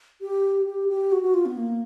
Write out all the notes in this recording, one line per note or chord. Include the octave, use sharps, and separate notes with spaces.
G4
G4
G4
F#4
F#4
F4
B3
A#3